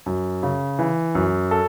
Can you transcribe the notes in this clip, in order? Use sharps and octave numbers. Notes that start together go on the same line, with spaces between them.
F#2
C#3
E3
F#2
A4